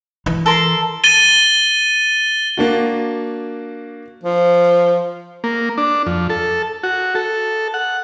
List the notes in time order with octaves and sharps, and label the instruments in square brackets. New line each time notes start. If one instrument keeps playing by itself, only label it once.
[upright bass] E3
[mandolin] A4 A#4 C6
[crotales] A6 D#7 G7
[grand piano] A#3 D4 F#4
[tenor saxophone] F3
[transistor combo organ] A#3
D4
F2
A4
F#4
A4
F#5